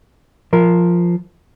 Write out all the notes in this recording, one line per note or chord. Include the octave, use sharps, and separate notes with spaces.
F3 A#4